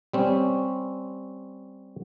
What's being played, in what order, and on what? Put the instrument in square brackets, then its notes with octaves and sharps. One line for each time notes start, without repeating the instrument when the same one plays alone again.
[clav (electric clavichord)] G3 C4 C#4